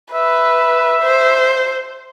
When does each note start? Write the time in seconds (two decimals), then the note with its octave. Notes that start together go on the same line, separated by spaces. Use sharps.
0.13 B4 E5
1.02 C5